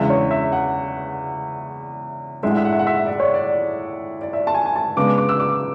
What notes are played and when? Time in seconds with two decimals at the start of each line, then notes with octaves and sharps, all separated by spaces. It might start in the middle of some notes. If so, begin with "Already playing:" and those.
Already playing: E2 C#3 G#3 D4 E5
0.10 C#5
0.31 E5
0.52 F#5
2.43 A2 G#3 D4 E5
2.50 F#5
2.57 E5
2.65 F#5
2.72 E5
2.79 F#5
2.87 E5
3.06 D5
3.20 C#5
3.34 D5
4.21 D5
4.33 E5
4.47 A5
4.54 G#5
4.66 G#5
4.76 A5
4.97 C#3 G#3 B3 D4 D6
5.18 D6
5.29 E6
5.40 D6